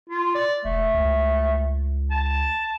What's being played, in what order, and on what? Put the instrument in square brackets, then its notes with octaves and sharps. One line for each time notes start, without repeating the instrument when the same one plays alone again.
[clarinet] F4
D5
[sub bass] E1 [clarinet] A3
[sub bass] C#2
[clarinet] A5